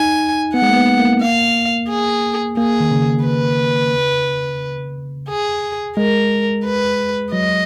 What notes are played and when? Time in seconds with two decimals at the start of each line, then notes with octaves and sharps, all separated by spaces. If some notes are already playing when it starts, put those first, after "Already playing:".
Already playing: D#4 G#5
0.54 B3 F#5
0.62 G#3
0.69 A#3
0.76 B3
0.99 A#3
1.21 F5
1.89 G#4
2.57 A#3 G#4
2.80 D#3
2.91 C#3
3.25 B4
5.29 G#4
5.97 G#3 A#4
6.65 B4
7.33 F#3 D#5